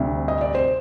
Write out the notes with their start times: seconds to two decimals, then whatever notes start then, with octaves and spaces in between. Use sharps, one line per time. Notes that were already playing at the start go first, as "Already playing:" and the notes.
Already playing: D2 C3 G3
0.28 D#5
0.41 D5
0.55 C5